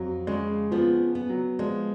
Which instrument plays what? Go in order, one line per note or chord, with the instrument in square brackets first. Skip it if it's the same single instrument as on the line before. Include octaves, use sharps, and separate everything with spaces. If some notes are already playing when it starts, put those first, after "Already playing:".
Already playing: [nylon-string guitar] F2 [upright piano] F#3
[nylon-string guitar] C#3 [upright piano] G#3
[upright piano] F3 [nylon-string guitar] B3
[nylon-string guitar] B3
[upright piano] F#3
[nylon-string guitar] F3 [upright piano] G#3